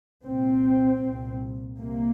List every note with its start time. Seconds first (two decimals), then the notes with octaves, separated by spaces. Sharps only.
0.24 C2 A#2 C4
1.00 C2 A#2
1.77 C2 C3 A#3